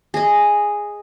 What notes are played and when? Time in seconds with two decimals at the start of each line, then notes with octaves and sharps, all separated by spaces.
0.14 G#4 D#5